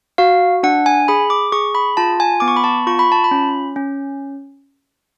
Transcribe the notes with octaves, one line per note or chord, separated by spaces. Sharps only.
F#4 F5
D4 F#5
G#5
G#4 B5
D6
G#4 C#6
B5
F4 A5
G#5
B3 D6
C#6
B5
A5
F4 C#6
B5
A5
B5
C#4
C#4